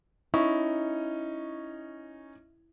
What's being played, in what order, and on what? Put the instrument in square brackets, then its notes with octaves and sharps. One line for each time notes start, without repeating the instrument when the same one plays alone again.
[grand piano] C#4 D#4 C#6 [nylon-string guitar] E4